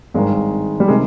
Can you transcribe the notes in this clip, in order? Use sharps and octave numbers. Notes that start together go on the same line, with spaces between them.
G#1 G2 D#3 G#3
G3
C3 D#3 G#3